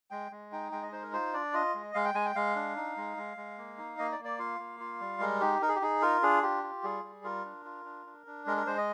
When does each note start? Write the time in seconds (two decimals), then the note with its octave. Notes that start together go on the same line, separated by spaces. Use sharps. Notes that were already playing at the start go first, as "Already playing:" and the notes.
0.10 G#3 G5
0.31 G#3
0.52 D#4 G5
0.72 G#3 G5
0.82 D#5
0.92 D#4 C5
1.02 A#4
1.13 F4 C5
1.33 D4 D5
1.54 F4 D#5
1.75 G#3
1.94 G#3 F5
2.05 G5
2.14 G#3 G#5
2.26 G5
2.35 G#3 F5
2.56 D4
2.76 D#4
2.97 G#3
3.17 G#3
3.37 G#3
3.58 A#3
3.78 D#4
3.99 A#3 D#5
4.12 D5
4.19 A#3
4.25 D5
4.39 F4 F5
4.59 A#3
4.80 F4
5.01 G3
5.20 G#3 A#4
5.40 D#4 G4
5.62 D#4 A#4
5.68 G#4
5.76 G4
5.82 D#4 G#4
6.02 F4 A#4
6.23 D4 G#4
6.43 F4 G4
6.63 F4
6.84 G3 G#4
7.04 G3
7.24 F4 A#4
7.45 D4
7.65 F4
7.85 D4
8.06 D4
8.27 D4
8.46 G#3 A#4
8.57 A#4
8.67 G#3 C5
8.78 D#5